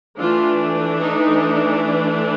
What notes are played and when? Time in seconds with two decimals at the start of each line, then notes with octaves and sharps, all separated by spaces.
0.18 E3 A3 D4 F4
1.00 D#4